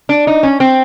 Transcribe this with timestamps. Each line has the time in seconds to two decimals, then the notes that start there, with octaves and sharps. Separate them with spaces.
0.09 D4
0.27 D#4
0.43 C#4
0.60 C4